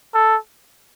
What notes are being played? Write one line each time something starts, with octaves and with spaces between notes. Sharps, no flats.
A4